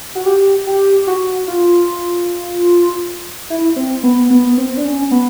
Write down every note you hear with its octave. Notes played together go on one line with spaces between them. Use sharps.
F#4
G4
G4
F#4
F4
E4
C4
B3
B3
C4
D4
C#4
B3